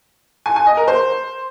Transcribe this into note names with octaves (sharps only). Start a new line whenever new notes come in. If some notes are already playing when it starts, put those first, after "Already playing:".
G#5
G#5
D#5
A#4
C5